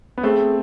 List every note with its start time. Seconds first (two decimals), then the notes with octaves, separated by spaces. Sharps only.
0.18 B3
0.24 A3 C4 G#4